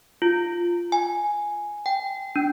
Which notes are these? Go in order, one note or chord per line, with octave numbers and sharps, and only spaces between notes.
F4
G#5
G5
D4